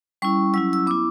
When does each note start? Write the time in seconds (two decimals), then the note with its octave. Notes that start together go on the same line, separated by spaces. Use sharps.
0.22 G3 C#4 E4 C#6
0.54 F#3 C#4 E4 E6
0.73 E6
0.87 B3 E4 D6